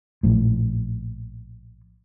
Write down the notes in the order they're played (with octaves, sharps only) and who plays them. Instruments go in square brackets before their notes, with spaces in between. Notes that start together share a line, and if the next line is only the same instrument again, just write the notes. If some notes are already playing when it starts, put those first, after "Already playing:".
[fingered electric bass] A#1 A2